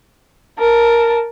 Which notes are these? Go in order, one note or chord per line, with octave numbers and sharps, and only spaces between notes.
A#4 A5